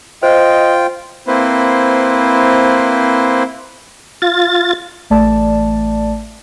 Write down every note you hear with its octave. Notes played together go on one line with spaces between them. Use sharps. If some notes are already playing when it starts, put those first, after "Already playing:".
F4 C5 D#5 G5
A#3 C4 E4 B4 C5
F4 A6
A1 A3 D5 A5